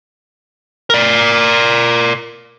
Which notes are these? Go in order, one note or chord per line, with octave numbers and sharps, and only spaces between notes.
A#4 D5